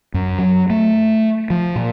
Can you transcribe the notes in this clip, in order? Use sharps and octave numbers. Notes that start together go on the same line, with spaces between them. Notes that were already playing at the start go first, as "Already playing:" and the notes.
F#2
F#3
A3
F3
A#2